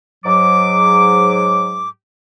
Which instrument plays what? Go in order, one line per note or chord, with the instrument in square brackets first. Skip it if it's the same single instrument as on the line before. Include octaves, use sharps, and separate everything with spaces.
[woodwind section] G#2 F#3 D6